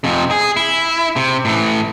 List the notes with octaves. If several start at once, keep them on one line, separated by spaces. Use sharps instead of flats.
F2 C3
G#4
E4
C3
A2 E3